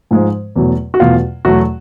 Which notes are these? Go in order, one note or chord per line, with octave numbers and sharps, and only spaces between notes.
G#2 F3 G#3
E2 B2 F#3 A3
F#4
E2 B2 F#3 A3 F4
E2 B2 F#3 A3 F#4